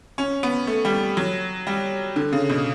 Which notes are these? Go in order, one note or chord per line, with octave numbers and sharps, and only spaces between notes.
C#4
B3
A3
G3
F#3
G3
D3
C#3
B2